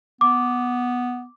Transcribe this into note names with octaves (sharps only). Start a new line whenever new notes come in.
B3 D6